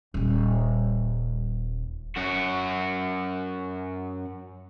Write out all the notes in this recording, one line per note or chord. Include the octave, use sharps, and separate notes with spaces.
D#1 G3
F#2 F#4